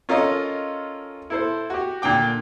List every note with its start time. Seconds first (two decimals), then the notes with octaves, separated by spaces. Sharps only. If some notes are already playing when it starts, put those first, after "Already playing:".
0.09 C#4 F4 A4 A#4 D#5
1.30 E4 A4 C5
1.70 F#4 G4
2.02 A#2 D3 G5 D6